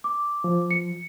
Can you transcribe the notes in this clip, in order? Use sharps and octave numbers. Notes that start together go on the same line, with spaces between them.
D6
F3
C#7